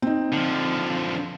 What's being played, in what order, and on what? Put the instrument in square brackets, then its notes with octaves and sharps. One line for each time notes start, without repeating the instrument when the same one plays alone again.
[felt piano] C4 D#4
[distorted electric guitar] D3 F3